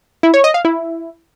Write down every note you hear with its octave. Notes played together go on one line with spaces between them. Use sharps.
E4
C#5
D#5
F5
E4